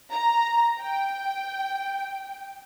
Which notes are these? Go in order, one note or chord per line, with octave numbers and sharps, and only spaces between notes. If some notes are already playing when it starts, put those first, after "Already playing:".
A#5
G5